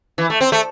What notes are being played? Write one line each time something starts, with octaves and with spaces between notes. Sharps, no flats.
E3
A3
C4
A3